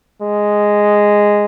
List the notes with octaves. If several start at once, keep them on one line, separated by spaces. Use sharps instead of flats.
G#3